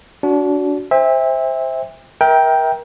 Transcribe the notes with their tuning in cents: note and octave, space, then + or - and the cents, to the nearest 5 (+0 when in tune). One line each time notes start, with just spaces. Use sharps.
D4 -30 F#4 +0
C5 +5 E5 -15 G5 +45
A#4 +25 E5 -30 G5 +0